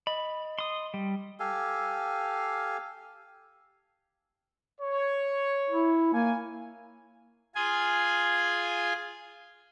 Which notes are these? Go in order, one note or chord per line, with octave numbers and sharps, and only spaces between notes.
D#5 B5
C6 D#6
G3
G4 A4 F5 G#5
C#5
E4
A#3 G#5
F4 G#4 G#5